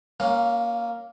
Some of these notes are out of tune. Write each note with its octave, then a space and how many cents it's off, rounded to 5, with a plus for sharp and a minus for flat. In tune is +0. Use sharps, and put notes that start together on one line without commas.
A#3 +0 C#4 +5 F5 +35